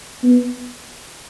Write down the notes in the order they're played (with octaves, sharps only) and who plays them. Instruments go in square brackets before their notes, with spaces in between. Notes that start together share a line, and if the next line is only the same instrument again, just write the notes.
[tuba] B3